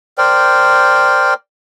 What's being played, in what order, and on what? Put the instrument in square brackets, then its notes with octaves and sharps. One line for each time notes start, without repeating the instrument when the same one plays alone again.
[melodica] A#4 C5 D5 G5